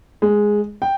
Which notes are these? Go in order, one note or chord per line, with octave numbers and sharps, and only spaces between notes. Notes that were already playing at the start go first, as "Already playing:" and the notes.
G#3
G5